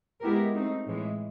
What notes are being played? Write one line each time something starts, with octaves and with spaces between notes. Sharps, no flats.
G#3 B3 E4 G4 A#4
A3 C4 D#4
A2 E3 G#3